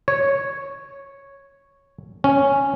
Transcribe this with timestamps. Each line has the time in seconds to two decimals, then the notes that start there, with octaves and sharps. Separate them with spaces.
0.08 C#5
2.24 C#4